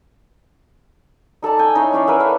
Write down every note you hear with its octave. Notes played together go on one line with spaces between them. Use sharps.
D#4 A4 D5 A5
G5 G#5
D#4 E4 C#5 F5
C#4 E4 D5 F5
A#4 B4 E5 F#5
A4 B4 E5 F5